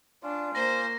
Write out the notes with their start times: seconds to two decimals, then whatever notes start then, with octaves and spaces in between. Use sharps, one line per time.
0.23 C#4 D4 F4
0.55 A#3 C5 A#6